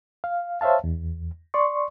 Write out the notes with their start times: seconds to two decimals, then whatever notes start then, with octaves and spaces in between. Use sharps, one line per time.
0.24 F5
0.61 C5 C#5 E5 F5 A5
0.84 E2
1.54 D5 C6 C#6